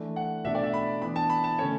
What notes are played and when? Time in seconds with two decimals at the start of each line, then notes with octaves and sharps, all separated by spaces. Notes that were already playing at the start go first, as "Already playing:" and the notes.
Already playing: E3 A3 D4
0.16 F#5
0.45 B2 A3 D4 E5
0.55 D5
0.63 E5
0.74 B5
1.01 E3 B3 D4 B5
1.16 A5
1.30 B5
1.44 A5
1.59 D3 A3 C#4 C#5